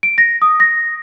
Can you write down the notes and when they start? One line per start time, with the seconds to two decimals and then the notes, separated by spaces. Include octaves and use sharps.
0.03 D7
0.18 A#6
0.42 D#6
0.60 A#6